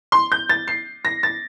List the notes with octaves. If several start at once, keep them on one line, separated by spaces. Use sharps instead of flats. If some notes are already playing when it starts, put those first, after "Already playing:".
C6
G6
A6
C7
A#6
A6